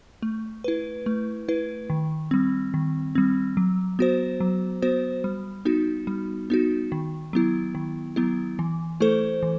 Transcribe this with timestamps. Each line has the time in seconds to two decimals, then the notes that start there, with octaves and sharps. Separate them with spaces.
0.23 A3
0.64 E4 B4
1.06 A3
1.49 E4 B4
1.90 D#3
2.31 G3 C4
2.74 D#3
3.15 G3 C4
3.57 F#3
3.99 B3 F#4 C5
4.40 F#3
4.82 B3 F#4 C5
5.24 G3
5.65 B3 D#4 F#4
6.07 G3
6.50 B3 D#4 F#4
6.92 D#3
7.33 F#3 B3 E4
7.75 D#3
8.16 F#3 B3 E4
8.59 E3
9.00 A3 E4 A4 C5
9.43 E3